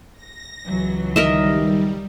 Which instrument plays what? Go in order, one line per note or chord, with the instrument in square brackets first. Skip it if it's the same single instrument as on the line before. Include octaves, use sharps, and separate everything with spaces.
[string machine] A#6
[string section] C#2 E3 F#3
[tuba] D#3 [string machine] G3 [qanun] A#4 D#5 E5